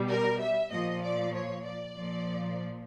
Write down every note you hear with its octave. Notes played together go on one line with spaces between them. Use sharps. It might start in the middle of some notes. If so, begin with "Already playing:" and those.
Already playing: B2 G3
A#4
E5
A#2 F3 D#5
D5
C#5
D5
A#2 F3